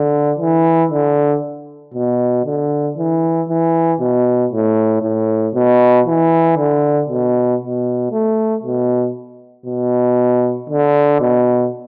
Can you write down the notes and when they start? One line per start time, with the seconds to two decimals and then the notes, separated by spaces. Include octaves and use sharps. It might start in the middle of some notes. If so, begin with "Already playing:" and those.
Already playing: D3
0.39 E3
0.91 D3
1.94 B2
2.45 D3
2.97 E3
3.49 E3
4.00 B2
4.52 A2
5.03 A2
5.54 B2
6.06 E3
6.57 D3
7.09 B2
7.61 B2
8.11 A3
8.63 B2
9.66 B2
10.70 D3
11.21 B2